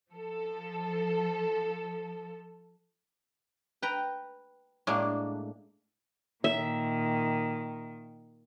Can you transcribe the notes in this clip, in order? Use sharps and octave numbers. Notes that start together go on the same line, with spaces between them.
F3 A4
B4 G5 A#5
A2 G#3 A#3 D4
A#2 D#3 E5